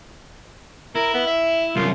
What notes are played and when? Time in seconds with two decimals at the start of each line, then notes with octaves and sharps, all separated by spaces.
0.95 E4 A#4
1.14 B3
1.27 E5
1.76 C2 F#2 F4